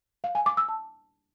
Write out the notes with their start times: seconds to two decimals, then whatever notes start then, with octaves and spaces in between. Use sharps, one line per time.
0.24 F5
0.35 G#5
0.46 D6
0.57 E6
0.69 A5